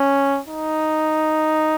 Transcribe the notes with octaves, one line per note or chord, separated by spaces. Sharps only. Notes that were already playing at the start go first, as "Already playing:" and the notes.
Already playing: C#4
D#4